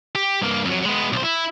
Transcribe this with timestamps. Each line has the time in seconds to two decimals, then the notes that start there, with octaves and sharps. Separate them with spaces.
0.15 G4
0.42 G2 A#3
0.65 F2 F#3
0.85 G#3 B3
1.13 B1 C5
1.24 E4